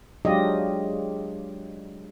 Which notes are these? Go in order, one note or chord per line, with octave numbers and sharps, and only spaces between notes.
F#3 G#3 D4 F4 G4 D#5